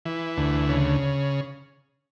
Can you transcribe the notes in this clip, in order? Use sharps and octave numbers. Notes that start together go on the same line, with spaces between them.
E3
D2
C#3